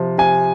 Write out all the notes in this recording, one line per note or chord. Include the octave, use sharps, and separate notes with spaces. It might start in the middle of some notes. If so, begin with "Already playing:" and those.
Already playing: C3 F3
C3 G#5